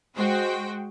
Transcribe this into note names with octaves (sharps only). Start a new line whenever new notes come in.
G#3 F#4 C5 G5